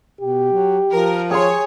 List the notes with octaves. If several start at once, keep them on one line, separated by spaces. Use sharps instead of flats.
B2 G4
F#3
F3 A#4
G#4 C#5 C6